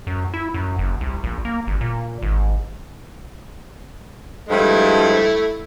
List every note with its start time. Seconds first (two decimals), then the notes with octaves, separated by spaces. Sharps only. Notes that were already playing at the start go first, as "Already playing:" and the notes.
0.07 F#2
0.34 E4
0.54 F#2
0.79 F#1
1.01 C2
1.24 A#1
1.45 A#3
1.67 G1
1.81 A#2
2.22 G#1
4.49 G2 F3 G#3 A3 E4